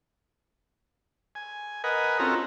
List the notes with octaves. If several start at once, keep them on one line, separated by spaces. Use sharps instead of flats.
G#5
A#4 B4 D#5 F#5 G#5
C4 C#4 F4 F#4 A4 A#5